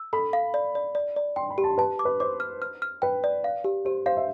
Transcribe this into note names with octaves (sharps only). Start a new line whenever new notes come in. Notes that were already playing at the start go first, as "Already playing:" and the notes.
Already playing: E6
A4 B5
F5
D5
D5
D5
D5
G5 C6
B5
G4
A5
B4 A5
D6
B4
C5 D6
F6
F6
F6
B4 G5
D5
F5
G4
G4 C5
C5 F5
E5